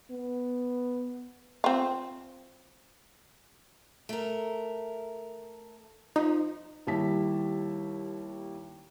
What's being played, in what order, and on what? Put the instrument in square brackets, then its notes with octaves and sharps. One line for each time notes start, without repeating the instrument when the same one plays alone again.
[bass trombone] B3
[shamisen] C4 F4
[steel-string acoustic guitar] A3 A#4
[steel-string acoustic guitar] F3 [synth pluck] D#4
[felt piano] D#2 G3 E4 A5 B6